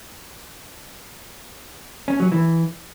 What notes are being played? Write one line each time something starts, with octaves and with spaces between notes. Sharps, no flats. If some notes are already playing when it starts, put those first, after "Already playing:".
C#4
F#3
E3